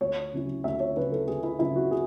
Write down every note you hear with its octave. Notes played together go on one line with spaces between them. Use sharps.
D2 C#5
C#3 F#3 C#4 E4
D2 E5
C#5
C#3 F#3 C#4 E4 B4
A4
D2 G#4
E4
C#3 F#3 C#4 E4
F#4
G#4